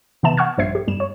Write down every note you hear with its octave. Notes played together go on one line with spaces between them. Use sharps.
C3 E3 B3 E5 A5 E7
F#5 C#6 F6 G#6
A#1 G2 C5 E5 G#6 C7
G4
G2 G3 E7
C#5